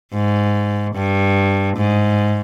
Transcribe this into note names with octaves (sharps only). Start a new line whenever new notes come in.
G#2
G2
G#2